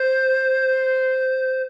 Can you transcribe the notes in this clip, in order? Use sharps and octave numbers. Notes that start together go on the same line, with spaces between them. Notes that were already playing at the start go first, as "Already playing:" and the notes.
Already playing: C5